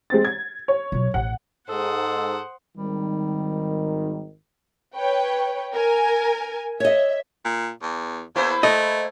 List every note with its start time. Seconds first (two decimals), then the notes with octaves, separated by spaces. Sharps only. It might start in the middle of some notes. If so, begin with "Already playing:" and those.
0.10 G#3 C4 A6
0.25 G#6
0.68 C#5
0.92 B1 F#3
1.14 A1 F#5
1.69 G#2 A4 C5 F#5 D#6
2.78 G#1 D#3 G3
4.95 B4 C#5 G5
5.74 A#4 G#5
6.80 C#5 D#5 E5
7.45 A#2
7.82 E2
8.36 E2 A#3 E4 C5
8.63 A3 D#5